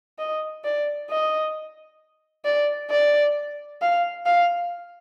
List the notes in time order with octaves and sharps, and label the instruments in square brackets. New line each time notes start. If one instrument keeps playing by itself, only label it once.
[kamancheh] D#5
D5
D#5
D5
D5
F5
F5